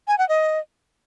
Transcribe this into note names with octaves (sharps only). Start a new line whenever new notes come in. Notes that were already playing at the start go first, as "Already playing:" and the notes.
G#5
F#5
D#5